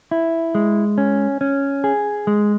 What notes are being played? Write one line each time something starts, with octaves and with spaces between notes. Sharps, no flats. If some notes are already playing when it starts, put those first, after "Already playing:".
E4
G#3
C#4
C#4
G#4
G#3